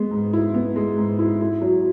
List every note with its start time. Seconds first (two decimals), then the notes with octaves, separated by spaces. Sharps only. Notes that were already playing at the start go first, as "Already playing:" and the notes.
Already playing: G#3 B3
0.11 G#2
0.33 E4
0.54 B3
0.76 G#3
0.98 G#2
1.19 E4
1.41 E4
1.61 F#3